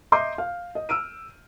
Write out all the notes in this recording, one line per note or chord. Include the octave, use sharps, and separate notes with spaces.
D#5 E5 A#5 C6 D6 G6
F5
D#5
E6 F6 D7 D#7